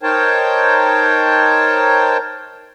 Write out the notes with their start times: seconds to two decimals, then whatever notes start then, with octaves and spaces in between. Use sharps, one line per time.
0.03 D#4 A#4 C5 C#5 G5 A5